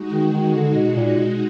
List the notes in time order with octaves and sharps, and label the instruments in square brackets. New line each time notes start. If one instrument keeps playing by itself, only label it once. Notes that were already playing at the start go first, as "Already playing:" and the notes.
Already playing: [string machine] G#3 D#4 F#4
[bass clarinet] D#3
D#3
D3
B2
A#2
B2